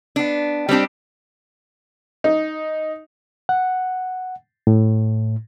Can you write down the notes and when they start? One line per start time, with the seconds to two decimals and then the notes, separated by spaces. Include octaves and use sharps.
0.16 B3 D4
0.69 G3 C4 D4 G4
2.24 D#4
3.49 F#5
4.67 A2